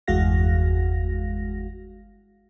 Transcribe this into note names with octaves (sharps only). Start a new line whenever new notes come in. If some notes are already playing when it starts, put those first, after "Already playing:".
G1 E2 G#3 F#4 F5 A#6